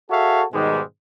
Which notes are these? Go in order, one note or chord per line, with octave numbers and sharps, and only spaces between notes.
F#4 G#4 A4 C#5 E5 F5
G#2 B2 D#3 G3 G#3